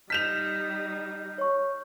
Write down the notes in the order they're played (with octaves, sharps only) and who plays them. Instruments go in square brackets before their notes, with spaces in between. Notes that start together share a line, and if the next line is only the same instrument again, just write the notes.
[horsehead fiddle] G3 D#4 [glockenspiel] F6 G6 [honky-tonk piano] B6 E7 F7
[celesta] C#5 C#6